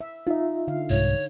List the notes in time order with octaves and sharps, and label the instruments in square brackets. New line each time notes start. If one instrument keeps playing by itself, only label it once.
[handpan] E5
[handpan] D#4 [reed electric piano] F4 E5
[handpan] D3 F5
[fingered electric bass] C2 G#2 [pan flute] C#5